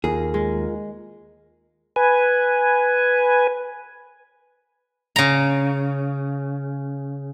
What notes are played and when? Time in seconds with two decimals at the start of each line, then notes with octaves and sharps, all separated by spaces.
0.04 D#2 F4 G#4 A#4
0.34 G#3
1.96 B4 G#5
5.16 C#3 A#5